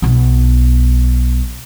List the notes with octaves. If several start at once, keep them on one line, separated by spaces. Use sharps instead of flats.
B1 B3